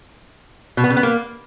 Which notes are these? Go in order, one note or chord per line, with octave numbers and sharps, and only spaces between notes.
B2
B3
C#3
B3
A#3